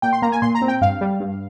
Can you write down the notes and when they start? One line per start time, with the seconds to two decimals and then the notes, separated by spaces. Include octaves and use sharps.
0.02 A#2 G5
0.13 C6
0.22 A#3 A#5
0.32 G#5
0.42 A#2 C6
0.55 A#5
0.62 C4
0.68 G5
0.81 G2 F5
1.01 G3
1.20 G2